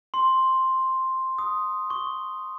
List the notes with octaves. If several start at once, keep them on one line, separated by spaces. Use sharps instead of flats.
C6
D#6
C#6